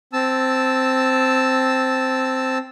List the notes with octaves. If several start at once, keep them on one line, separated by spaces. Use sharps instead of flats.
C4 A5 E6